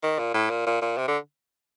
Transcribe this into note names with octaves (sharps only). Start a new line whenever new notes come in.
D#3
A#2
A2
A#2
A#2
A#2
C3
D3